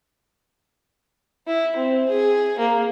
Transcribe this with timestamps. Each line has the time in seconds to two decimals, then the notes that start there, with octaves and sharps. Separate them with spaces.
1.47 E4
1.76 C4
2.09 G#4
2.59 A#3